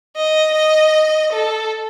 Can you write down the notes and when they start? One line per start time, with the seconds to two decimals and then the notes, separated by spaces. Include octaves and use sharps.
0.17 D#5
0.55 D#5
1.33 A4